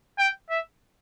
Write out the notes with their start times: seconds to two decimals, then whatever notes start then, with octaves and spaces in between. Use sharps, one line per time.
0.18 G5
0.49 E5